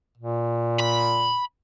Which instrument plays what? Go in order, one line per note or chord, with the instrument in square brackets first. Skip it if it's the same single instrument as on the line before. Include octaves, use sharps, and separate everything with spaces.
[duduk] A#2
[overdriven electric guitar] B5